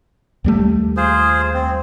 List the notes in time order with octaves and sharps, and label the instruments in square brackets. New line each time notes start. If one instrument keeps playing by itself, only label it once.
[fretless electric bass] D#2 G3 A3
[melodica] F4 G#4 C5
C4